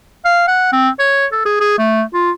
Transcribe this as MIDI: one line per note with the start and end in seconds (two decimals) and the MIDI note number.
0.25 0.43 77
0.48 0.70 78
0.73 0.89 60
1.00 1.26 73
1.32 1.41 69
1.46 1.58 68
1.61 1.78 68
1.79 2.02 57
2.14 2.31 65